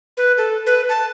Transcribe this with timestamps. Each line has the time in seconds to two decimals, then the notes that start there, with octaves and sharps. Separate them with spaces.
0.17 B4
0.38 A4
0.66 B4
0.89 A5